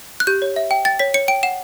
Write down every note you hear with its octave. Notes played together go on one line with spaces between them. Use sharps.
F#6
G4 G6
C#5
E5
G5
G5 A6
C#5 B6
C#5 C#7
G5 D7
F#5 E7